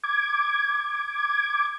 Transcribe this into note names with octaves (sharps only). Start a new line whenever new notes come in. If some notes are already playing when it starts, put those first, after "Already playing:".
D6 G#6